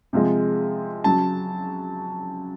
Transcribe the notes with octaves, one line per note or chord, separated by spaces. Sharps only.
C3 F3 G#3
C#3 F#3 A5